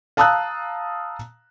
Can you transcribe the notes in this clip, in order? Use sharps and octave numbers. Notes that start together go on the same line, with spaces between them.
F5 A5 A#5 D#6 E6 F#6